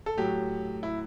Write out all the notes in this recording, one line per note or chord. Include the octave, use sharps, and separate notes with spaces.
A4
A2 F#3 G4
E4